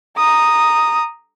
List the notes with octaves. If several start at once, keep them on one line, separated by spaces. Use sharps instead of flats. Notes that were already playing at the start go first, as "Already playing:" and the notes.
A#5 D#6